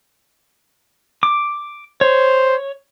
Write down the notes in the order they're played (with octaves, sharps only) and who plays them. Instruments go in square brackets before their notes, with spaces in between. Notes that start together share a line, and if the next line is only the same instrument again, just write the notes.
[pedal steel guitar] D6
[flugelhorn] C5 [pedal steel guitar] C#5